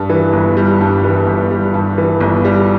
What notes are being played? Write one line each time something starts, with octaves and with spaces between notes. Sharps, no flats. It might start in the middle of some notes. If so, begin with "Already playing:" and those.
Already playing: G2
E3
G1
G3
G2
E3
G1
G3
G2
E3
G1
G3